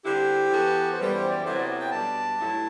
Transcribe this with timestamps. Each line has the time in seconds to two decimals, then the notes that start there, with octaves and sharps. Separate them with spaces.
0.05 D3 G3 C4 E4 G4
0.51 E3 B3 F#4 A4
0.92 C5
0.98 F#2 E3 G3 B3 B4
1.14 C5
1.29 D5
1.44 C3 F#3 B3 E4 A4 C5
1.57 D5
1.80 G5
1.91 B2 G3 D4 A5
2.38 G2 F#3 A3 E4